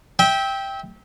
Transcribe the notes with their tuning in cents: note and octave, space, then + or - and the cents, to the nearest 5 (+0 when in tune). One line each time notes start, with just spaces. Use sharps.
E5 -30 G5 +0